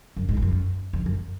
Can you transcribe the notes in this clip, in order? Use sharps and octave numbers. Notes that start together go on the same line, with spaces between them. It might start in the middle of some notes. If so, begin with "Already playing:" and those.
F#2
G#2
F2
F#2
F2
F#2